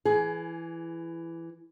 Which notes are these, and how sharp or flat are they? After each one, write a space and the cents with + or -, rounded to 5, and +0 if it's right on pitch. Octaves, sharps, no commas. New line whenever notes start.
E3 +15 G#4 +25